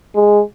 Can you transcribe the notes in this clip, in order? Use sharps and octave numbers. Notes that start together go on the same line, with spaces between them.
G#3